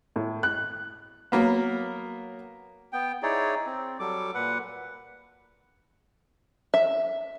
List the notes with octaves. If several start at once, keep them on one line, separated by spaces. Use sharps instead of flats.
A2
F#6
F#3 A#3 B3
B3 G5
D#4 E4 G#4 C#5 D5
C4
F#3 G3 A4 D6
A#2 B4 F#5
E5